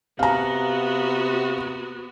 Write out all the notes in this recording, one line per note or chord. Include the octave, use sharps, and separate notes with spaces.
C3 B3 F#4 F5 A#5